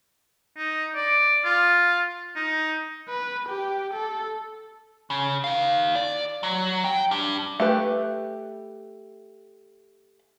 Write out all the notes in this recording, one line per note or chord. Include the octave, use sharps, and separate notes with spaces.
D#4
D5
F4
D#4
B4
G4
A4
C#3
D#4 F5
D5
F#3
G5
G3 D4
A3 G4 B4